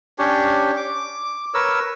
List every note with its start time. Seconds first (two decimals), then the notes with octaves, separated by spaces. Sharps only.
0.19 C#4 D4 G4 C#5
0.77 D6
1.54 A#4 B4 C#5 E6